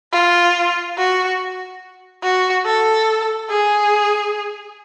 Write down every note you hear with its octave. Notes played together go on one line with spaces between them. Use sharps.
F4
F#4
F#4
A4
G#4